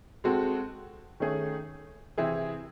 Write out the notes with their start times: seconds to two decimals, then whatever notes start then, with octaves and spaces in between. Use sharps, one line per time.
0.24 G#3 C4 F#4 A4
1.20 D#3 A3 C#4 G#4
2.18 C3 E3 C4 E4 G#4